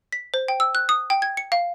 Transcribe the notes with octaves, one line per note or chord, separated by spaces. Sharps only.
B6
C5
G5
E6
F#6
D#6
G5
G#6
C#7
F5